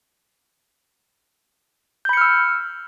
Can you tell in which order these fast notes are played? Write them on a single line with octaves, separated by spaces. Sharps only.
G6 B5 C#7 F6 E6